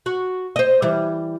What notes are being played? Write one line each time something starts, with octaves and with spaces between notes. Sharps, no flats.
F#4
C5 D#5
E3 G3